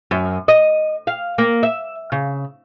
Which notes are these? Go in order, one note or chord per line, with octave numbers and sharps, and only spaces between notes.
F#2
D#5
F5
A#3
E5
C#3